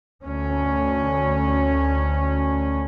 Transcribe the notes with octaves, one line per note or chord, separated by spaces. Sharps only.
D2 C#4